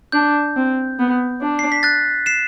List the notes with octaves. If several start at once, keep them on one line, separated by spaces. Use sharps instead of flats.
D4 G6
C4
B3
D4
C7
B6
F#6 A6
C7 E7